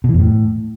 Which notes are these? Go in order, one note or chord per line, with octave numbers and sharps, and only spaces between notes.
B2
E3
F2
A2